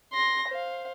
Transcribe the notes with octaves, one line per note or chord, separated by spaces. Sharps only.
C6 A#6
C5 F5